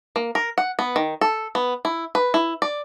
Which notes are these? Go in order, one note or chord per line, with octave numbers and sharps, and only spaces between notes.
A#3
A#4
F#5
B3
D#3
A4
B3
E4
B4
E4
D5